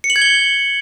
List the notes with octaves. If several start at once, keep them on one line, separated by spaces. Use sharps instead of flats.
C#7
F#7
G#6
G7